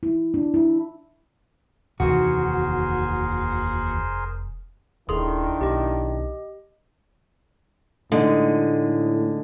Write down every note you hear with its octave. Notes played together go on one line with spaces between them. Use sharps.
E4
D4
E4
F1 D#2 D#3 E3 F#4 G#4 A#4 C5
D#1 D#3 D4 E4 G#4 A4 C6 D#6
B1 G4 D#5
A2 D3 G#3 A3 D#4 D#5